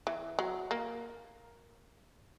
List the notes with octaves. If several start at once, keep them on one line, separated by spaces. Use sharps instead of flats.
E3
F#3
A#3